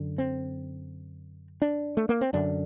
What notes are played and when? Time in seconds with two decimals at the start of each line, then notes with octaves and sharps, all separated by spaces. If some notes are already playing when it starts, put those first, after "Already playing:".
Already playing: F#2 D3
0.18 C4
1.62 D4
1.97 A3
2.09 A#3
2.21 C4
2.33 F#2 D3 D4